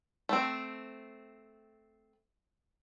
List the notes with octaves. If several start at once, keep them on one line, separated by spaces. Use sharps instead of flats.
A3 C4